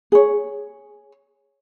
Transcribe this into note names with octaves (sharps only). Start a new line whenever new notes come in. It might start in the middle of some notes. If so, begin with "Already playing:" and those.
G#4 C#5